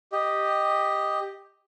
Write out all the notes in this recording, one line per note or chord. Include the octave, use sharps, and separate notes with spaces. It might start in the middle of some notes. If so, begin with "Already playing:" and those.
G4 D#5